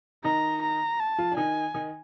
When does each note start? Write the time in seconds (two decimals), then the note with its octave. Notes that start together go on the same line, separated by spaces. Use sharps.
0.24 D#3 D#4 A#5
0.62 A#5
1.00 A5
1.18 F3 F4
1.32 D4
1.37 D#3 D#4 G#5
1.75 D#3 D#4